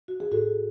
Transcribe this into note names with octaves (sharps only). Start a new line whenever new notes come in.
F#4
G#4
A2 F#4 A4